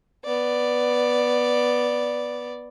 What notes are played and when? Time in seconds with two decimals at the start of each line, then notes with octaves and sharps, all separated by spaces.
0.25 B3 D5